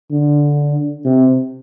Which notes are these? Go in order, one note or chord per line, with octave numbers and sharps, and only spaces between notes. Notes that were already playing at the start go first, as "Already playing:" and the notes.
D3
C3